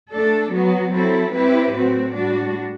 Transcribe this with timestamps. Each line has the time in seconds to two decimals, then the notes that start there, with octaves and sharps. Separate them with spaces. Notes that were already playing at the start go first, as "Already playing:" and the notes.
0.11 A3 D4 A4
0.52 F#3 B3 F#4
0.92 F#3 C4 E4 A4
1.32 G3 C4 E4 G4 B4
1.74 A2 F#3 C4 F#4
2.14 A2 G3 D4 F#4